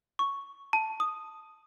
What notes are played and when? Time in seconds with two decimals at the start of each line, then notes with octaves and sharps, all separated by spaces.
0.19 C#6
0.73 A5
1.00 D#6